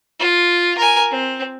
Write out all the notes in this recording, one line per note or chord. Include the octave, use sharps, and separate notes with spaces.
F4
A#4 G#5
C4